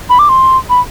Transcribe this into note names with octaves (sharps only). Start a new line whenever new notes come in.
B5
D6
C6
B5